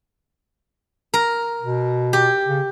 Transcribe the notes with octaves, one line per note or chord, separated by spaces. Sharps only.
A#4
B2
G4
C#3